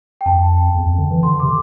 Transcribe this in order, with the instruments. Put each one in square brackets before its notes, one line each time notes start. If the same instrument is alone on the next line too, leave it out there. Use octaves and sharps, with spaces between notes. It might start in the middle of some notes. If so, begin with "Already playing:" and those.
[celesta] G5
[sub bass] F2 [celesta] A5
[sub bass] E2
F2
D3
E3
[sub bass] D3 [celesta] C6
[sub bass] C3 [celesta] D6